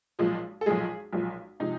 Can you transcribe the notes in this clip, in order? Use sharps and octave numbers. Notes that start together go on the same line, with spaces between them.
B1 A#2 F3 G#3
A4
B1 A#2 F3 G#3 G#4
B1 A#2 F3 G#3
C3 F3 G#3 D#4